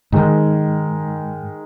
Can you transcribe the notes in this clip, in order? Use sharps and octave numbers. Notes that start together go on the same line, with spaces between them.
G#2 D#3 G#3 D#4